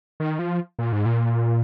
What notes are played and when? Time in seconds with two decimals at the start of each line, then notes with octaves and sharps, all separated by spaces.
0.20 D#3
0.39 F3
0.79 A#2
0.92 G#2
1.06 A#2